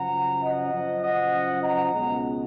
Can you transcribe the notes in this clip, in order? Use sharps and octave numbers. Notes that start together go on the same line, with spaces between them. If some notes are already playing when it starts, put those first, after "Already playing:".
Already playing: F#2 C#3 F3 F#5 A#5
D#5 F#5
F#2 C#3 F3
D#5 F#5
F#5 A#5
C#2 B2 G#3 C#4